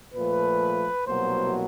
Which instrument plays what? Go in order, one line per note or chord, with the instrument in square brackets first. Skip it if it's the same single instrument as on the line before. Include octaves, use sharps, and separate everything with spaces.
[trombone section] A#2 F3 A3 B4
C2 B2 F#3 A#3 C5